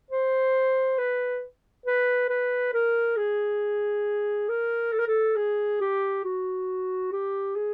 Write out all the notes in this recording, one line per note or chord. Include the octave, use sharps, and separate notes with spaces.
C5
B4
B4
B4
A#4
G#4
A#4
A4
A#4
A4
G#4
G4
F#4
G4
G#4